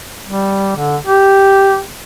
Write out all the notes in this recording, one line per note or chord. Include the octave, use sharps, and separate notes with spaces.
G3
D3
G4